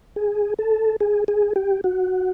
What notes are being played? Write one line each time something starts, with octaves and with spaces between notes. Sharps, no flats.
G#4
A4
G#4
G#4
G4
F#4